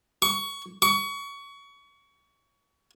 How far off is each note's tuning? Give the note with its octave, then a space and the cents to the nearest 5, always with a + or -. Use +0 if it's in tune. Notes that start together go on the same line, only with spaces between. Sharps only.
C#6 +15
C#6 +25